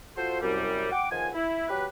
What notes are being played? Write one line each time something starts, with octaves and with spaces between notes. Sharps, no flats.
F4 F#4 A4 C5
C2 F#2 G3
F#5 G5 D6
C#2 D#3 F3 F#5 G#5
E4
F#3 G4 B4